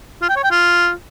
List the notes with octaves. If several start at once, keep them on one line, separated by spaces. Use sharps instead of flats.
F4
G5
C#5
G5
F4